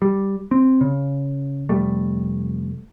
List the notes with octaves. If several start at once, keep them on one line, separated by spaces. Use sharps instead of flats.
G3
C4
C#3
F1 G3 A3